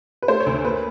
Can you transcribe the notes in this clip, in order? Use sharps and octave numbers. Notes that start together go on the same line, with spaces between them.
B4
A3 C5
C#5
D2
A#3 B4